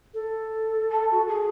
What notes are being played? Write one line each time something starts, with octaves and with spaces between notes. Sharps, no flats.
A4
A5
F#4
G#4